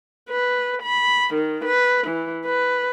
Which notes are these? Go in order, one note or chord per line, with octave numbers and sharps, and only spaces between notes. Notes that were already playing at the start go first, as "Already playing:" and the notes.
B4
B5
D#3
B4
E3
B4